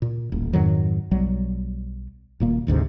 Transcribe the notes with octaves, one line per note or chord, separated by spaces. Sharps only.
A#2
D#1 A1
F2 G#2 D#3 F#3
B1 F#3 G3
D#1 A#2 A#3
F#1 D2 G#2 C3